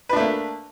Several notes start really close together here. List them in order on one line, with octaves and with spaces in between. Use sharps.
B4 D4 A3 A#3